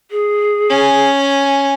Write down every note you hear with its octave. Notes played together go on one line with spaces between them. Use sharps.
G#4
C#4 G#5